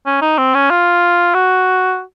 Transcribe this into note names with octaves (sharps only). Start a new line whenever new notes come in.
C#4
D#4
C4
C#4
F4
F#4